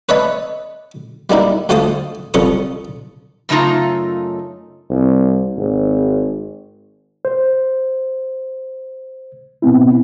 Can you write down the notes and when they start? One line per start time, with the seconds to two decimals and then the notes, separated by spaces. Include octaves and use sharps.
0.09 B4 C#5 D#5 E5 A5 B5
1.30 G3 A#3 D#4 E4
1.69 D2 A3 F4 C5 A5 D#6
2.34 C2 F3 A4 C#6 D#6
3.49 F#2 C#3 A3 D#4 F4 A#5
4.90 C2
5.57 G#1
7.25 C5
9.62 B2 B3 C4 E4